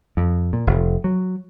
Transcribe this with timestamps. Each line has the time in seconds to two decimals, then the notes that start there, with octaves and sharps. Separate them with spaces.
0.17 F2
0.53 A#2
0.67 F1
1.04 F#3